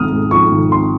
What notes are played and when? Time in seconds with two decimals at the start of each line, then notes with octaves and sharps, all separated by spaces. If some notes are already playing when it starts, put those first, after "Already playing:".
Already playing: G#1 G#2 F3 C4 D#6 F6
0.11 G#2
0.31 F3 C#6
0.51 G#1
0.72 C4 C6